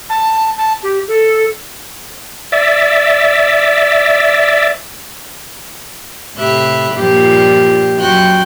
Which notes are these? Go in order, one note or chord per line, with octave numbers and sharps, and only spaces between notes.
A5
A5
G4
A4
D5 E5
A2 C3 G4 E5 B5 F#6
G2 A#2 F3 G4
F#2 F#4 F#5 G5 C6 F#6